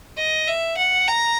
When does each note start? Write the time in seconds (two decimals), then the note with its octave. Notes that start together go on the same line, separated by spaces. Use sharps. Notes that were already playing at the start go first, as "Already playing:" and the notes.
0.17 D#5
0.47 E5
0.77 F#5
1.08 A#5